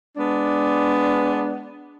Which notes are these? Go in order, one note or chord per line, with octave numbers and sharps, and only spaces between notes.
G#3 B3 D4